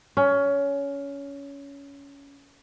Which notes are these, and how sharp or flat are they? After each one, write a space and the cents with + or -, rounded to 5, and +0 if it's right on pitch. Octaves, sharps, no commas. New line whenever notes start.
C#4 +20